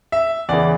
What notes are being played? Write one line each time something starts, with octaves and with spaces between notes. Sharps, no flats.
E5
E2 C#3 E3 D5